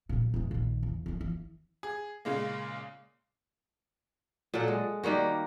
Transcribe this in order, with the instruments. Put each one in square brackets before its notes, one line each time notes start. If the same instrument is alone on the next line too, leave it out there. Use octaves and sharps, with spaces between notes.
[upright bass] A#2 F#3
E2 G#3
A#1 D#3
E2
C2 F2
E3
[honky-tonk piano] G#4
A#2 C#3 G#3 A#3
[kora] A#2 F#3 A4 F#5
G#3
D#3 G3 A#3 F#4